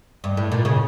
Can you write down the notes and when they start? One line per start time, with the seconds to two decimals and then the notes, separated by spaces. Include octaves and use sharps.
0.24 G2
0.37 A2
0.52 A#2
0.65 C#3